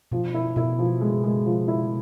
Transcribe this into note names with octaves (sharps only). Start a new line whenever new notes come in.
B2 F3
E4
B2 E4
F3
G#3
G#3
F3
E4